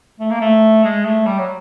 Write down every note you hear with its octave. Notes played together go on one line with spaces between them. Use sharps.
A3
A#3
A3
G#3
A3
G3
F#3